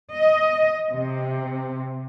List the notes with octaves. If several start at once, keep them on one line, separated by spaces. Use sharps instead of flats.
D#5
C3